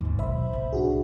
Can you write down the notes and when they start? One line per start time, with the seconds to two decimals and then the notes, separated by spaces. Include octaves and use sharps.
0.01 D#2 G#2 C#3
0.19 B1 A#2 C5 E5 B5
0.53 C2 A2
0.73 D4 F#4 G#4